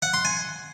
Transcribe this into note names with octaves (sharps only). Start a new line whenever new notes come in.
F#5
C6
G#5